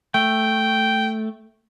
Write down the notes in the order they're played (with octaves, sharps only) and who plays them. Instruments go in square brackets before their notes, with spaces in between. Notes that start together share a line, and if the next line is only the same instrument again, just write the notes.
[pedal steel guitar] A3 [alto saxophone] G5